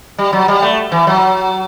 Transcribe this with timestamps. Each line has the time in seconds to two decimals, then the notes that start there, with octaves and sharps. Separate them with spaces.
0.18 G3
0.33 F#3
0.48 G3
0.62 A3
0.92 E3
1.07 F#3